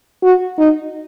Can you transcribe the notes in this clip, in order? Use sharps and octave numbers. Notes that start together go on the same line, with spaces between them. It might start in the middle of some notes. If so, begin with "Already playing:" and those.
F#4
D#4